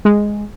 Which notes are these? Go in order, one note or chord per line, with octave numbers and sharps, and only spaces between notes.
G#3